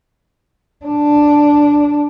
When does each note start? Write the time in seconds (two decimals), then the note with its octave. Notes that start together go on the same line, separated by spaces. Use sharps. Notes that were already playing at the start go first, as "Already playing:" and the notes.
0.86 D4